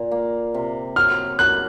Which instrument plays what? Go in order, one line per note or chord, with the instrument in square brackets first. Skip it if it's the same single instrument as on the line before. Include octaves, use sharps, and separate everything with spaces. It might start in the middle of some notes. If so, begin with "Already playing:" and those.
Already playing: [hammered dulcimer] A#2
A#3
C3
[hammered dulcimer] F#3 [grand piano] F6
[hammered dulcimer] F#3 [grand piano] F#6